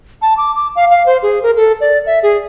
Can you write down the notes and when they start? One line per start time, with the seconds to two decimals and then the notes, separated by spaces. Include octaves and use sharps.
0.22 A5
0.37 D6
0.55 D6
0.76 F5
0.91 F5
1.06 C5
1.23 G#4
1.43 A#4
1.56 A4
1.81 D5
2.06 E5
2.23 G#4